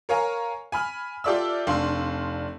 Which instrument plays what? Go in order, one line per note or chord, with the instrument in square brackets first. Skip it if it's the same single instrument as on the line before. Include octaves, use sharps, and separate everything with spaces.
[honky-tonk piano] A#4 C#5 F5 G#5 A#5
G#5 B5 F6
F4 G4 A4 D5 E5 E6
F1 D4 F5 C6